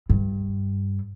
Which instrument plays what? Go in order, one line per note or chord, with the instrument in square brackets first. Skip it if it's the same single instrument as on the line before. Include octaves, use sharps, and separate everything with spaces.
[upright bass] G2